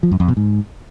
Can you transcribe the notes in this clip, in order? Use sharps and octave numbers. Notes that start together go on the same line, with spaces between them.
F3
F#2
F2
B2
G#2